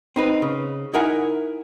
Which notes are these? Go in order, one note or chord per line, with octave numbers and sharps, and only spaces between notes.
C4 D#4 B4
C#3
D#4 E4 A#4 F#5 G#5